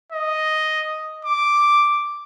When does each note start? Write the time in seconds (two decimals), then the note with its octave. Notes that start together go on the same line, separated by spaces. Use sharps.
0.12 D#5
1.25 D6